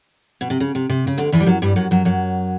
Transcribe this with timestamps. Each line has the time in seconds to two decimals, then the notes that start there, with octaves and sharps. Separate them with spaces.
0.41 B2
0.50 C3
0.60 C#3
0.75 C3
0.89 C3
1.07 C#3
1.18 D2 D3
1.32 E2 E3
1.40 G3
1.46 F#2 F#3
1.62 G2 G3
1.76 F#2 F#3
1.91 F#2 F#3
2.05 F#2 F#3